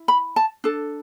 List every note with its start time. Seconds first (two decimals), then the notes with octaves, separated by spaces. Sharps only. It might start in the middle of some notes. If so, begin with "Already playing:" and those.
Already playing: E4
0.08 B5
0.36 A5
0.64 D4 A4